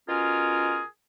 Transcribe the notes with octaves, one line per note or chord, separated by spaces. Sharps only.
B2 C#4 F4 G#4 A#4